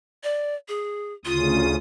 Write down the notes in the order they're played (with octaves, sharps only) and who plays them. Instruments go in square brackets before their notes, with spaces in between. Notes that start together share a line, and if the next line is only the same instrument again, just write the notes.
[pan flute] D5
G#4
[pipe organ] D2 C#3 D#6 [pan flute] F4